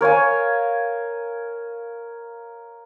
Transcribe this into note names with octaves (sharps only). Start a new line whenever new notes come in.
A#4 C#5 F5 G#5